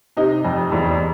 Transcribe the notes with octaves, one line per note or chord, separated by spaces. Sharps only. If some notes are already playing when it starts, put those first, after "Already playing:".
C3 D#4
F2
E2